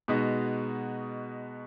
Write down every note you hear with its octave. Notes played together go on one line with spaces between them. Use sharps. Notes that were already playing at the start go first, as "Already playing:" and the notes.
B2 G#3 B3 D#4 F#4